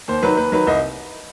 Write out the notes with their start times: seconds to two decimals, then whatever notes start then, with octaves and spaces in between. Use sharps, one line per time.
0.08 D#2 C5
0.23 D#3 F#3 B4
0.37 D#2 B4
0.52 D#3 F#3 B4
0.67 C2 D#5